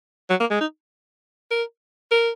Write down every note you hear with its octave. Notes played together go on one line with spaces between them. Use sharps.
F#3
A#3
G#3
D#4
A#4
A#4